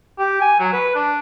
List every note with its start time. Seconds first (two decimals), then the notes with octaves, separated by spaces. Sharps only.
0.19 G4
0.41 G#5
0.60 F#3
0.73 B4
0.95 D4